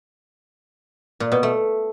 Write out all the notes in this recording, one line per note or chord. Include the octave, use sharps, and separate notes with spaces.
A#2
B2
A3